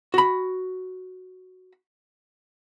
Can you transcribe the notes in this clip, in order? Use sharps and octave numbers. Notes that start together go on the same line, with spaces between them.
F#4 B5